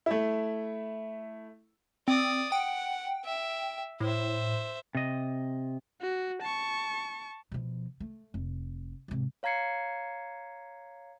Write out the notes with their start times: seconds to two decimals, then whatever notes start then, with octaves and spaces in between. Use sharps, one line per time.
0.06 A3 E4
2.08 C4 D5 D#6
2.52 F#5 G5
3.25 E5
4.00 A2 C5 E5
4.95 C3 D#5
6.01 F#4
6.42 A5 C#6
7.52 B2 F3
8.00 A3
8.34 F1
9.08 G#2 C3
9.43 C#5 F5 A#5 G#6 C7 C#7